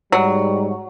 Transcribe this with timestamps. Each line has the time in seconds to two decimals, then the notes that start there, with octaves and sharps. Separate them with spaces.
0.12 G#2 F#3 G3